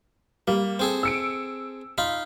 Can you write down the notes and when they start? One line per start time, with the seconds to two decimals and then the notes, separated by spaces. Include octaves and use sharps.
0.48 G3 A#3
0.79 C4 G#4 A4
1.03 E6 C#7 D7
1.98 D#4 F4 B5